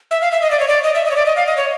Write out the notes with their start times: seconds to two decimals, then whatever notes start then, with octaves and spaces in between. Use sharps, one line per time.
0.11 E5
0.22 F5
0.32 E5
0.42 D#5
0.51 D5
0.60 C#5
0.68 D5
0.84 D#5
0.95 E5
1.05 D#5
1.11 C#5
1.16 D5
1.26 D#5
1.36 F5
1.47 D#5
1.57 C#5